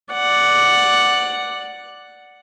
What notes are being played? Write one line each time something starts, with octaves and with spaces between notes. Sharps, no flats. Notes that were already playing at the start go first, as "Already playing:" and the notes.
D5 F#5